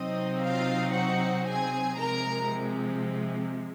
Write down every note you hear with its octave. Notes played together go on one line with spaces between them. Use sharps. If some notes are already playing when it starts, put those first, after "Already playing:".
Already playing: C3 F#3 C4 D#4 D#5
F4 F5
F#4 F#5
G#4 G#5
C3 F3 G#3 A#4 A#5